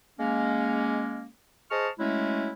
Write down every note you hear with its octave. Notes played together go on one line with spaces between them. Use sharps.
G#3 A#3 C#4
G#4 C5 D#5 A5 C#6 F6
F#3 G#3 A3 C#4 E4